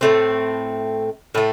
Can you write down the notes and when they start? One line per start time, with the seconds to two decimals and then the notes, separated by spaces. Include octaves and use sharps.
0.01 A2 A3 C4
1.35 A2 A3